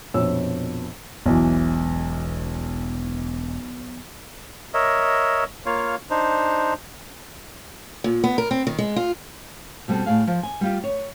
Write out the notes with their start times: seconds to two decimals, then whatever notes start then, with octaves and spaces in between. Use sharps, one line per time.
0.14 A#1 F2 B2 C#5 E6
1.26 E1 B1 E3
4.74 A#4 C#5 D#5 E5
5.66 A#3 F4 C#5 F5
6.10 D4 D#4 C5
8.04 A#2
8.24 B3
8.38 A#4
8.51 C4
8.67 D#3
8.79 G#3
8.96 F4
9.88 B2 G3 C4 A4
10.06 A2 G#4 F5
10.27 F3
10.43 G#5
10.61 G3 F4 G4
10.84 C#5